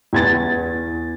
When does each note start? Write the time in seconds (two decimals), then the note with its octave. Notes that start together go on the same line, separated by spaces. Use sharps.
0.13 E2 G#6 A6